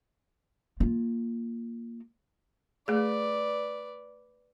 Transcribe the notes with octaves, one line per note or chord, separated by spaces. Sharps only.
A#3 F4
A3 G#4 B4 D5